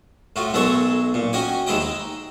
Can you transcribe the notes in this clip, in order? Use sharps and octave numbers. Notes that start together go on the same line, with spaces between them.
A2 F4 F#4
B1 G#3 A4 A#4 C#5 C#6
A#2
C#4 F#4 D#5 G5 G#5
D#2 D#3 G#3 E4 D#5 G5
D#4